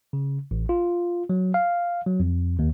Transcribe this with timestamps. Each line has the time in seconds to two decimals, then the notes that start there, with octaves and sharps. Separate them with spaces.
0.13 C#3
0.51 A1
0.69 F4
1.30 F#3
1.54 F5
2.06 F#3
2.20 F2
2.59 D#2